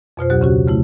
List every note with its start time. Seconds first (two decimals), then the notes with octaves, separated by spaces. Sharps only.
0.17 F2 B2 F4 C5
0.30 D2 B2 F#3 G4 F#6
0.41 C#3 C#4 F#4 G4
0.68 C#3 A3 E4